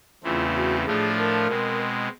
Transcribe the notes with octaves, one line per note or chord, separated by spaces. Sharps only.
E2 C#3 E3 A3 C4 F4
F#4
A2 F3 A3 D4 F4 G#4
A#4
B2 G#3 C4